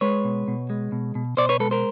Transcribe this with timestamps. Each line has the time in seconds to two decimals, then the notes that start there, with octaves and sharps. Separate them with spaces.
0.01 G#3 B4 C#5
0.24 B2
0.48 B2
0.70 G#3
0.92 B2
1.15 B2
1.37 B2 C5 D5
1.49 B4 C#5
1.60 G#3 A4 B4
1.71 A#4 C5